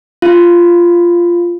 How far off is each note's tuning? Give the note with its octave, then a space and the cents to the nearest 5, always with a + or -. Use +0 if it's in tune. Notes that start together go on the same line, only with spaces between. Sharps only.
F4 -10 F5 +0